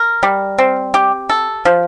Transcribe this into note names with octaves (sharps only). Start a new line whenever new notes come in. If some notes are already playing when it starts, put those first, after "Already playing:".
Already playing: A#4
G3
C4
G4
A4
F3